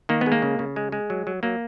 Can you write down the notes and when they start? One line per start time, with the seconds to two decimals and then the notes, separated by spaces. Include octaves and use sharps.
0.09 D#3 A#3
0.21 B3
0.26 G#3
0.32 A#3
0.42 C#3
0.59 C#3
0.76 G#3
0.92 G#3
1.10 F#3
1.27 F#3
1.43 F#3 A#3